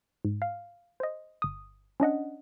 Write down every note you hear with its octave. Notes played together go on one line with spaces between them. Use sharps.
G#2
F5
C5 D#5
G1 D#6
C#4 D4 D#5 F#5